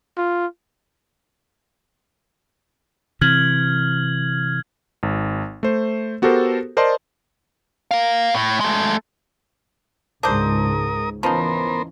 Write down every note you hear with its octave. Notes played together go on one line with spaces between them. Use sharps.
F4
C3 E3 F6 G#6 F#7
G#1
A3 C5
B3 F#4 G4 A4 A#4 C5
A#4 C5 D5 D#5 A5 C6
A#4 F5
A2
G#3 A3
C#2 G#2 D4 A#4 C5 D#6
E3 F3 B3 C#4 D#4 A#4 C5